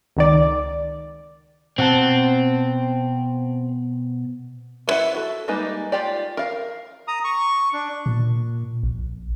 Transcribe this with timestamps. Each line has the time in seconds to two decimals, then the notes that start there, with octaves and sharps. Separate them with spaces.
0.17 C#2 D#3 D5
1.78 B2 C4 F#5 A5
4.88 B3 E4 B4 E5 F#5
5.14 F#4 A4
5.48 G3 G#3 A#3 D#4 B4
5.92 F4 G4 D5
6.37 A#4 F5
7.08 A#5 D#6
7.24 C#6
7.73 D4
8.06 A#2
8.83 A#1